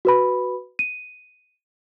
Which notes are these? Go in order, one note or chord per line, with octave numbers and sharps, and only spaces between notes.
F#4 B4 B5
D#7